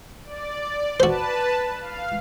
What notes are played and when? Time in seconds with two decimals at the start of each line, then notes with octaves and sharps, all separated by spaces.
0.23 D5
1.00 F#4 B4 C5 A5
1.81 F5